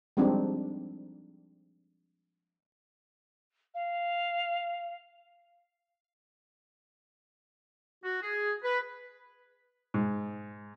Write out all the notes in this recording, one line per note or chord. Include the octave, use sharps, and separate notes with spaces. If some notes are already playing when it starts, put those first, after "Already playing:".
F3 G3 G#3 C4 D4 D#4
F5
F#4
G#4
B4
G#2